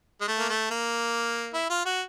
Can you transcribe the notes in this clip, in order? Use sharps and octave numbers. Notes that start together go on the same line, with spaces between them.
G#3
A3
A#3
A3
A#3
E4
F4
F#4